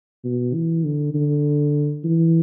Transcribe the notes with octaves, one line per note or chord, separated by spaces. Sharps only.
B2
E3
D3
D3
E3